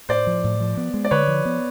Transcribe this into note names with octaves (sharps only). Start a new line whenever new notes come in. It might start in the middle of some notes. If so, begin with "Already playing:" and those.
A2 C5 D5
F3
A2
F3
B3
G#3
D5
D3 B4 C#5
F3
B3